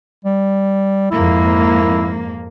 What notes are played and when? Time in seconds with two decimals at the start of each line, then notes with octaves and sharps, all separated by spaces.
0.25 G3
1.11 F2 G#2 A#3 E4